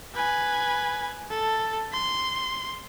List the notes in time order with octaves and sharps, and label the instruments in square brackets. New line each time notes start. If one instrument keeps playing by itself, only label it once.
[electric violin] B4 G#5
A4
C6